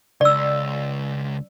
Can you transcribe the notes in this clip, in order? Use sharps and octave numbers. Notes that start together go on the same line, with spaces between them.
C#2 D5 E6